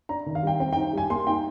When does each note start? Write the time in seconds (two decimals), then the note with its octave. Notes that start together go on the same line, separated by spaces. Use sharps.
0.09 D4 A#5
0.26 D#3
0.35 F5
0.43 G3 G5
0.60 C4 G5
0.73 G5
0.76 D#4
0.93 G3 G#5
1.10 A#3 C6
1.27 D#4 G5